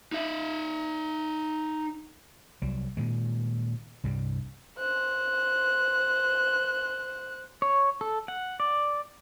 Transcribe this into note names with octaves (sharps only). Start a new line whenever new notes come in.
D#4 E5
C2 F#3 G3
A#2 D#3 G#3
C2 G2 C3 G3
C5 F#6
C#5
A4
F#5
D5